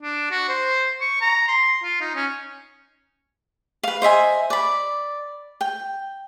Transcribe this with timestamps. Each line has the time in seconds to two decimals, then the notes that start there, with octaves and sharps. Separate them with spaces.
0.02 D4
0.31 F#4
0.49 C5
1.01 C#6
1.21 A#5
1.48 C6
1.84 F4
2.01 D#4
2.15 C#4
3.83 B4 F5
4.02 C5 D#5 E5 G#5
4.50 D5 B5
5.61 G5